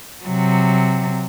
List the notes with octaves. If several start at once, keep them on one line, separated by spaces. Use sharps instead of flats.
C3 F#3